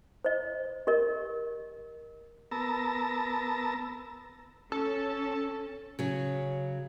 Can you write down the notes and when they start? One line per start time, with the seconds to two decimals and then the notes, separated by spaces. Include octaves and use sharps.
0.25 C5 D#5
0.87 G4 A#4 D#5
2.51 B3 A#4 A5 A#5 E6
4.72 C#4 A4
5.99 C#3 F#3